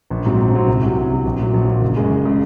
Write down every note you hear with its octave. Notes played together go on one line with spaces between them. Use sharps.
A#1
G#2 F#3 C4
A#1
G#2 F#3 C4
C2
C3 F#3
C2
C3 F#3
A#1
A#2 F#3
A#1
A#2 F#3
F#1
F#2 C#3 G#3
F#1
C#3 G#3